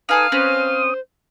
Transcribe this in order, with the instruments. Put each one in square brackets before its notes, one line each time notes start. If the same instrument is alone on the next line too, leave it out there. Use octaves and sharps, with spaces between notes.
[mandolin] D#4 G#4 A4 [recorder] B4 [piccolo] F5 [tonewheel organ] D#6
[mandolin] C4 C#4 B4 [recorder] C5